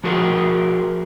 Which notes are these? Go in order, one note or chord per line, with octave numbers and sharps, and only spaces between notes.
F3 F#4 G#4 A#4